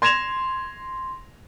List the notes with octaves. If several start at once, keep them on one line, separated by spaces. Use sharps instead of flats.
C6 G#6 A#6 E7 F7